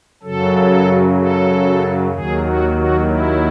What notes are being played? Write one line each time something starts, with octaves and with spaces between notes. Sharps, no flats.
F#2 C#3 F#3 A4
A4
D#2 D#3 F#3 G#4
F#4
F#4
E4